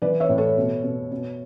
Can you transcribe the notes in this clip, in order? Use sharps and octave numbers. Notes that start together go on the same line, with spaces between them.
E3 B4 D5
C#5 E5
A2
A4 C#5
B2
B2
B2